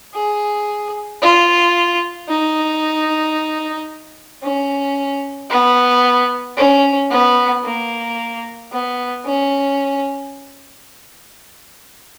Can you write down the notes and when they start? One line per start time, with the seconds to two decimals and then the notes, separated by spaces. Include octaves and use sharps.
0.14 G#4
1.21 F4
2.29 D#4
4.42 C#4
5.50 B3
6.57 C#4
7.10 B3
7.64 A#3
8.72 B3
9.25 C#4